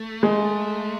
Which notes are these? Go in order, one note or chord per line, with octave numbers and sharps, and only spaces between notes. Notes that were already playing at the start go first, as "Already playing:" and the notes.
Already playing: A3
G#3